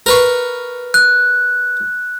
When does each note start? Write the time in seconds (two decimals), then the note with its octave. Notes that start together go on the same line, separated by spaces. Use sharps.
0.06 A#4 B4 C#6
0.94 F#6